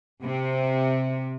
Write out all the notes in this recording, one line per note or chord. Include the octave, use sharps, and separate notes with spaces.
C3